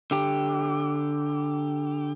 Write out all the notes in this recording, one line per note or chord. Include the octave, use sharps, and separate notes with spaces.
D3 G4